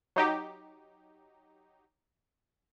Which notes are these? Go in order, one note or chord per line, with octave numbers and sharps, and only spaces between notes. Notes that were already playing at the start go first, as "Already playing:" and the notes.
F#3 D#4 G4